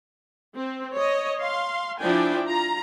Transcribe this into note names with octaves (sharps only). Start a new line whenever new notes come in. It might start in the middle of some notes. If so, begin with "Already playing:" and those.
C4
C#5 D#5
F5 C6
F3 D4 E4 D5 G5 G#5
F4 A#5